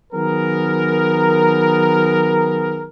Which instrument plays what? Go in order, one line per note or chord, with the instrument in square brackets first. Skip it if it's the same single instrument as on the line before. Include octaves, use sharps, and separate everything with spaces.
[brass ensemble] D#3 F#3 B3 G#4 A#4